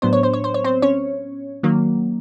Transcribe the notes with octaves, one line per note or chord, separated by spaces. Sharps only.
A2 F#3 B3 D4 C5
C#5
C5
C#5
C5
C#5
C4 C5
C#4 C#5
D#3 F#3 A#3